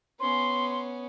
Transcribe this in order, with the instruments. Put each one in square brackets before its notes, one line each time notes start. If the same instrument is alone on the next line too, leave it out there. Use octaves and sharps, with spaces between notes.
[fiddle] B3 C#4 [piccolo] C6